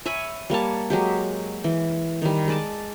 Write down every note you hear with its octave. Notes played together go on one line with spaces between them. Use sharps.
C#5 E5 G#5 B5
G3 A#3 C#5 A5
F#3 G#3 G4
E3
D#3 G3
G#3 D5 A5